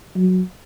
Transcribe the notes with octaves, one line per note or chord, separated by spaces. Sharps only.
F#3